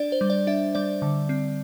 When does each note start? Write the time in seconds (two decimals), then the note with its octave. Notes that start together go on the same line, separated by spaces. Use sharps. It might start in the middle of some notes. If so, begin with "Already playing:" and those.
Already playing: D4 D5
0.12 C5
0.21 G3
0.30 D5
0.47 D4 E5
0.75 G3 D5
1.02 D3
1.29 C4